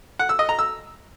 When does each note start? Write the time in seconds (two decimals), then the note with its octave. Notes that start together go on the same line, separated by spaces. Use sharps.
0.19 F#5
0.29 E6
0.39 D#5
0.49 A#5
0.59 E6